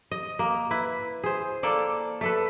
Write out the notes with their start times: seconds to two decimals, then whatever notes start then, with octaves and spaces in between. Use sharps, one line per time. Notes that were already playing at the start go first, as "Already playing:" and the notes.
0.11 D#5
0.39 A#3
0.71 E4 B4
1.24 G#4 C5
1.63 A#3 A4 D5
2.21 A3 A4 B4